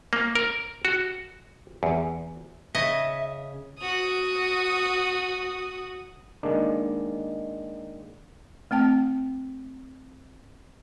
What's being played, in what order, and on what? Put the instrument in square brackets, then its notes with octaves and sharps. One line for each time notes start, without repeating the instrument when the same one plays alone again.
[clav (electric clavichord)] A#3
A#4
F#4
E2
[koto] C#3 D#5 [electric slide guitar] E5
[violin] F#4 D#6
[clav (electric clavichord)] D#3 G#3 A#3 D4
[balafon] A3 C4 G5 A5